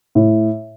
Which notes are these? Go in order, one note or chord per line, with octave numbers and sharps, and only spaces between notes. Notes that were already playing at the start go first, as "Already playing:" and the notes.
A2